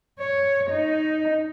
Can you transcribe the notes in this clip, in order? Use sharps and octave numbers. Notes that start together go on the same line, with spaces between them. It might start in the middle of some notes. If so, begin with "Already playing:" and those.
C#5
D#4